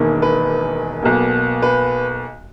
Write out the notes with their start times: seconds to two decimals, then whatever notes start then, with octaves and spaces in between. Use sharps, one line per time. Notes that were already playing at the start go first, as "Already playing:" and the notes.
Already playing: E1 E2 D#3 A#3
0.22 B4
1.02 B1 B2 A#3
1.62 B4